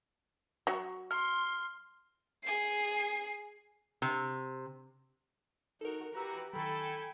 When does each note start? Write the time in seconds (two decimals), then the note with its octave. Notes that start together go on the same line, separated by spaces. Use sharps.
0.67 F#3 F#4
1.11 C6 F6
2.43 G#4 C7
4.02 C3
5.81 D#4 F#4 A4 A#4
6.14 E3 F#4 G4 B4 A#5 E6
6.53 D#3 F#3 A4 G5 G#5 B5